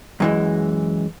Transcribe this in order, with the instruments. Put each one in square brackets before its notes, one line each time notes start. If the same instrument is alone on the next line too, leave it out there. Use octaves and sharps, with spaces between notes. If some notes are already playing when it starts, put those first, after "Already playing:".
[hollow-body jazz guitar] F#2 E3 G#3